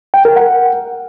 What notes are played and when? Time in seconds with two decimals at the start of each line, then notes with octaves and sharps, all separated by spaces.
0.14 G5
0.25 A#4
0.36 F#5